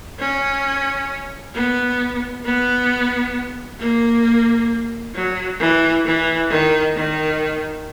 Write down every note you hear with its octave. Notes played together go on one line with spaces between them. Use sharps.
C#4
B3
B3
A#3
F#3
E3
E3
D#3
D#3